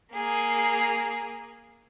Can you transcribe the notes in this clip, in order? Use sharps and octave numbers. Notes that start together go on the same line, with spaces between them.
A#3 G#4